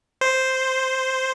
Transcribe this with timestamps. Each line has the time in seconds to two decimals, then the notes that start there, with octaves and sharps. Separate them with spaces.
0.21 C5